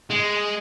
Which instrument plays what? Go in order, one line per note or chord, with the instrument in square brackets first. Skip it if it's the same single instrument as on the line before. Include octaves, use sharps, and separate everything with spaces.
[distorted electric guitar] G#3